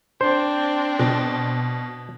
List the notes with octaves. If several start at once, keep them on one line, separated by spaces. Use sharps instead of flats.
C4 D4 C5
B2